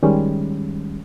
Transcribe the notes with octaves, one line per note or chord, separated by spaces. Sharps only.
D#3 G3 G#3 C#4